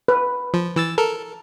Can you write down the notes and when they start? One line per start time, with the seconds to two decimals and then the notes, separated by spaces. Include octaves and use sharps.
0.08 B4
0.54 F3
0.76 E3 E6 A6
0.98 A4 A#4